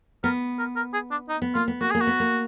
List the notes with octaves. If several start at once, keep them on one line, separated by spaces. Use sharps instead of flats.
B3 A#4
A#4
A#4
G#4
D4
D#4
B3
A#3 F4
B3
A#3 F#4
A#3 G#4
F#4
B3
A#3